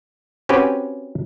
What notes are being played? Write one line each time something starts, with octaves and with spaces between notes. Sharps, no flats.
C4 C#4 F#4 G4 B4 G#5